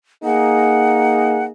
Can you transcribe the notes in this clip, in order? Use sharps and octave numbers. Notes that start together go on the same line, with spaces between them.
A#3 D#4 G#4 F#5